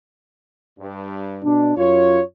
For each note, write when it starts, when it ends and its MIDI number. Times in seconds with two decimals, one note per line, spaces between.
0.79 1.45 43
1.44 1.75 47
1.44 1.75 62
1.77 2.21 42
1.77 2.21 65
1.77 2.21 73